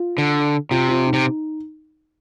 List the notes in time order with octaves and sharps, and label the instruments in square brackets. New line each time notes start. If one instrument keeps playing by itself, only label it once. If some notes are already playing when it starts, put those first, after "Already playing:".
Already playing: [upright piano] F4
[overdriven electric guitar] D3
[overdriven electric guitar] C3 [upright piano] F4
[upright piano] F4
D#4
[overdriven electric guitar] C3